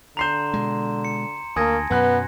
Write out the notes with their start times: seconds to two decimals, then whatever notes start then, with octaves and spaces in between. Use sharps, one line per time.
0.17 D3 A#5 C6 G6 C7 E7 F7
0.54 B2 G#3
1.04 C#7
1.56 D2 A#3 G#5 A5 D#6 G#6 A#6
1.90 F#2 B2 F#3 B3 B4 F#6